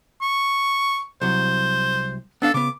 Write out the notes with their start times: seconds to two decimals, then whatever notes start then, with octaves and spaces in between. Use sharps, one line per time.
0.21 C#6
1.21 C2 F#3 C5
2.42 B3 D4 A4 F5
2.54 C#3 B3 D6